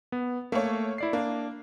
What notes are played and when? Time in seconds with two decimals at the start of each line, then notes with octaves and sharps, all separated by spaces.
0.12 B3
0.52 A3 A#3 C#5
0.98 E4 D5 C7
1.13 A#3 D4